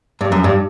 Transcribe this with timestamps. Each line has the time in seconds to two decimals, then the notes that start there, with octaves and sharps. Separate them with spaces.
0.21 G2
0.32 F#2
0.44 G2